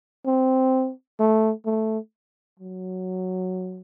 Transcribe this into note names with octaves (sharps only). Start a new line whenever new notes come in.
C4
A3
A3
F#3